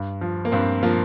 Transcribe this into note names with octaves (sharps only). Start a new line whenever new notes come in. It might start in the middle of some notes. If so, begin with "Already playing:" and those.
Already playing: G2
F3
A#3
G2 C4
F3 A#3